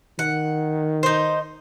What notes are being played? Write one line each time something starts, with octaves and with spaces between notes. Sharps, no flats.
D#3 F#5
D#4 C5